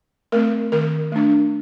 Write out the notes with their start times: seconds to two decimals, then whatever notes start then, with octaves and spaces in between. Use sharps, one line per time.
0.32 A3 C4 A#4
0.72 D#3 A#4
1.12 A3 D4